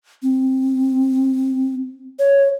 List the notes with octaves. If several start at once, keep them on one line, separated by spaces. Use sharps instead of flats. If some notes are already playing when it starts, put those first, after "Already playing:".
C4
C#5